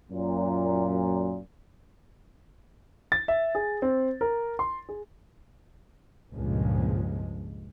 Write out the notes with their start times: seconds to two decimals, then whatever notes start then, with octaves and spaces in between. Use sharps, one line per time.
0.11 F#2 A#2
3.12 A6
3.28 E5
3.55 G#4
3.82 C4
4.21 A#4
4.59 C6
4.89 G#4
6.33 C#2 G2 A#2 F3 G#3